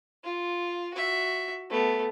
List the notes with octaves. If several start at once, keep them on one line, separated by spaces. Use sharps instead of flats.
F4
F#4 E5
A3 B3